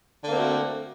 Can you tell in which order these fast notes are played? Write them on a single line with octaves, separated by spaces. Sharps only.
D3 A#3 C4 A3 F#4